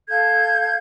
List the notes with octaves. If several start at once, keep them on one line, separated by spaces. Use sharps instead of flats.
A4 F5 G6 G#6